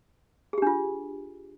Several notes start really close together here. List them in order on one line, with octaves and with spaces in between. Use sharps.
G#4 G4 D4 F4